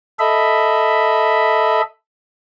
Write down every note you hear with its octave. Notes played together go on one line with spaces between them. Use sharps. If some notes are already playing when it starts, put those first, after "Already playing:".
A4 D#5 E5 B5